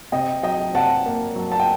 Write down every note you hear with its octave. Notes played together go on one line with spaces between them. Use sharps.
C3 D#5 G5
F#3 D#5 G5
C3 F#5 A5
A#3
F#3
A5
G5